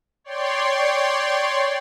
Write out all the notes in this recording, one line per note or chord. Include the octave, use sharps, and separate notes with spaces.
C#5 D5 G5 C6